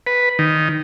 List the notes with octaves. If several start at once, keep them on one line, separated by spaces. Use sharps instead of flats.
B4
D#3